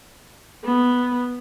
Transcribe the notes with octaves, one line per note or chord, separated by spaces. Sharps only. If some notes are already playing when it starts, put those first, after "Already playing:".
B3